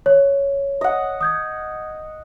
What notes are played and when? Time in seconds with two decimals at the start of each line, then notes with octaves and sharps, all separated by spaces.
0.06 C#5
0.81 D#5 F#5
1.21 D#6 G6 G#6